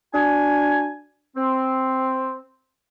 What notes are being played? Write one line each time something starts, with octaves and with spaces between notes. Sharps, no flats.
D4 F#4 G#5
C4